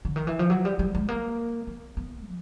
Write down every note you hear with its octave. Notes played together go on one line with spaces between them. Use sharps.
D3
D#3
E3
F3
F#3
G3
G3
G#3
A#3
B3
B3
F3